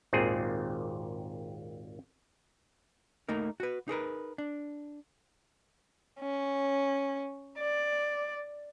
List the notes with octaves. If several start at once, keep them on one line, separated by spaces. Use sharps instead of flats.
G#1 D#2 A#2 C4 G#4
A3 A#3 D#4 A#4
F#4 B4
D#4 G#4 A#4 B4
D4
C#4
D5